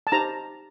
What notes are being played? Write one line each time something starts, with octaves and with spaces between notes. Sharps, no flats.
A5
D#4 G4 C5 A#5